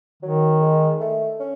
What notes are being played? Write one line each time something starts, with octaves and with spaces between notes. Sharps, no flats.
D#3 F#3
G#3
A3
C#4